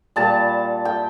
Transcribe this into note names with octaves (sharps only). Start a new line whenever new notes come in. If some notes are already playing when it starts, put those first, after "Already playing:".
A#2 G3 A5
G5